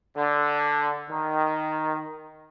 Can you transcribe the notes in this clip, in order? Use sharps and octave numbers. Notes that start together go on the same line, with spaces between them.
D3
D#3